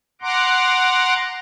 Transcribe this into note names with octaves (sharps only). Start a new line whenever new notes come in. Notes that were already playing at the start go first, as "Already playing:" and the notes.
F#5 A#5 C6 D6